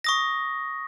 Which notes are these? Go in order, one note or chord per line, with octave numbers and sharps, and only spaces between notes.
C#6 D#6 A#6